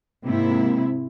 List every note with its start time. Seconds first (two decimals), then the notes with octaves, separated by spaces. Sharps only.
0.24 G#2 C3 A#3 E4